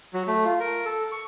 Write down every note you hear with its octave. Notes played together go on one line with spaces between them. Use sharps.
F#3
A3
F4
A#4
A4
C#6